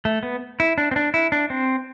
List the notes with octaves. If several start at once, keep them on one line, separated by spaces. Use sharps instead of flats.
A3
B3
E4
D4
C4
D4
E4
D4
C4